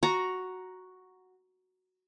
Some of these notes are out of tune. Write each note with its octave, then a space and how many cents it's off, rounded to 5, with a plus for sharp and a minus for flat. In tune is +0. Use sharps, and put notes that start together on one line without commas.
F#4 +0 A#5 +5